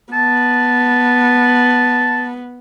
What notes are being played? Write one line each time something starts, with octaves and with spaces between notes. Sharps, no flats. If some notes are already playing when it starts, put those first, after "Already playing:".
B3 A5